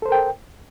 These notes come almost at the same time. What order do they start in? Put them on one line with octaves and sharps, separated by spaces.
A4 C5 A#4 G5